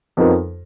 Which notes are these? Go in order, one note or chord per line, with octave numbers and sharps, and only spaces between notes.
F2 F3 B3 D#4 A#4